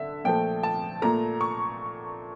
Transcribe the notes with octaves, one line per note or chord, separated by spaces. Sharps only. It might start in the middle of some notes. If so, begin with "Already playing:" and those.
Already playing: D3 E5
A#2 F3 A3 G5
A5
A#2 A3 A#5
C#6